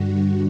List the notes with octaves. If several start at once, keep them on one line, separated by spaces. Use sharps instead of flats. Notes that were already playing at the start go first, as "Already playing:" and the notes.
Already playing: G2 D3 G3 F#4